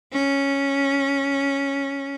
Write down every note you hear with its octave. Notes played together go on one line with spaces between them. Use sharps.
C#4